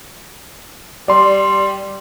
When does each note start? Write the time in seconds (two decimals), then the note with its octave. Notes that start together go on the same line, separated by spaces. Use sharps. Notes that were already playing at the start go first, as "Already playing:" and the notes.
1.08 G3 D5 C6